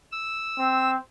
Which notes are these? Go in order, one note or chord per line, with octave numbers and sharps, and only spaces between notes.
E6
C4